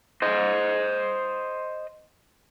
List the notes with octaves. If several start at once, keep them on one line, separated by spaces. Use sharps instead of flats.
C5 D#5